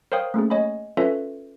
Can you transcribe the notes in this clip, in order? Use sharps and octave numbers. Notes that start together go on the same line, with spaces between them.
A#4 C5 C#5 F5 G5 D#6
A3 A#3 C#4 G#4
C#5 D#5 G#5 B5
C#4 F4 A4 B4 C#5 E5